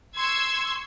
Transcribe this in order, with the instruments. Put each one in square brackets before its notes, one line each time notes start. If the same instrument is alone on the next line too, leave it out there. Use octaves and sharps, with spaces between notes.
[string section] C6 C#6 E6 G#6